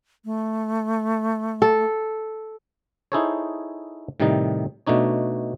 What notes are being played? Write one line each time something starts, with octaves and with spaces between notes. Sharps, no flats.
A3
A4
D#4 E4 G#4 A4 C5 C#5
A2 C3 D#3 G3 D#4
B2 A3 D4 D#4 C#5